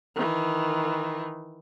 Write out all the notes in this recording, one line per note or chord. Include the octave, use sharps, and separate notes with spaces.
D#3 E3